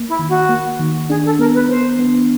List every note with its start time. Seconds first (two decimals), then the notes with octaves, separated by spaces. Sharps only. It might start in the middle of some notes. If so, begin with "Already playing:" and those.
Already playing: A#3
0.08 E4
0.19 D#3
0.28 F#4
0.49 A#3
0.80 D#3
1.09 D4 G#4
1.25 A4
1.39 B3 A#4
1.54 B4
1.69 B3 C5
1.99 B3